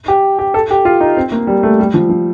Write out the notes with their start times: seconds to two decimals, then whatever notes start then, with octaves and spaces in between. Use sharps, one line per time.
0.08 G4
0.39 G4
0.54 A4
0.71 G4
0.85 F4
1.01 D#4
1.17 C4
1.32 A#3
1.47 G3
1.63 A3
1.80 G3
1.94 F3
2.09 F3